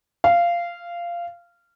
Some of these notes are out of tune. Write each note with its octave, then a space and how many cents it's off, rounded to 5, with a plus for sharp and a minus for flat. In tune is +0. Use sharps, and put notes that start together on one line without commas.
F5 -15